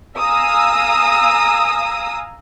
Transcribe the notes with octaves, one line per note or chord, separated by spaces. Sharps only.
F5 G#5 A#5 D#6 E6